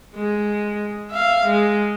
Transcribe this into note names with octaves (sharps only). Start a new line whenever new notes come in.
G#3
E5 F5
G#3